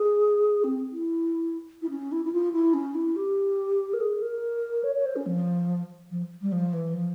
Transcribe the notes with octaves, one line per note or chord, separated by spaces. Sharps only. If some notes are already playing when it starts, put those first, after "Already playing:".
Already playing: G#4
C4
E4
E4
C#4
E4
E4
F4
E4
C#4
E4
G4
A#4
G#4
A#4
C#5
C#5
C5
C#4
F3
F3
G3
F3
E3
F3